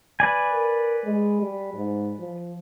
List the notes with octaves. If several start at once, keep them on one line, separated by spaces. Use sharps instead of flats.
B4 D5 G#5
A#4
G#3
G3
G#2
F3